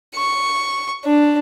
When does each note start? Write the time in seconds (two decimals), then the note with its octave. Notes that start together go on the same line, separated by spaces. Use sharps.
0.16 C#6
1.05 D4